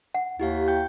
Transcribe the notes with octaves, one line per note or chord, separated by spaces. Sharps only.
F#5
D#2 E4 G4 F5
G5 G6